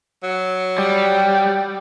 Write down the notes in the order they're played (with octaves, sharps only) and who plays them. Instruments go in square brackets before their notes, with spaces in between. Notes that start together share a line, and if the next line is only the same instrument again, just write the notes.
[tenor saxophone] F#3
[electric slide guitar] G3